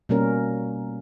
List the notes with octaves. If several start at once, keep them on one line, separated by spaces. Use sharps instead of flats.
B2 G3 A#3 C#4 A#4